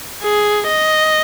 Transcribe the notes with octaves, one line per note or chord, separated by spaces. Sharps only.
G#4
D#5